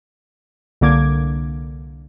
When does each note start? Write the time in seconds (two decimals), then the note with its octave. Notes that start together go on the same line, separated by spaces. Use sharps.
0.81 C2 D3 A#3 D6 G#6